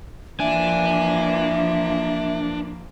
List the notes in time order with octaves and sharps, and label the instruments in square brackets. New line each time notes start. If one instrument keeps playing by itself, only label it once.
[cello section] E3 F3 A#3 [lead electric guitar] D4 [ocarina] E5 [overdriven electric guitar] G#5